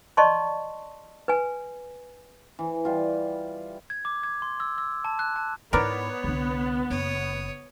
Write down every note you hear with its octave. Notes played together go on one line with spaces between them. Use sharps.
D5 D#5 A5 C6 C#6
B4 G#5
E3
G3 F4
G#6
D6
G#6
C6
E6
E6
A5
F#6
A5
G#2 B3 E4 A#4 B4 C#5 D5
C2 D3
F#1 C#5 D#6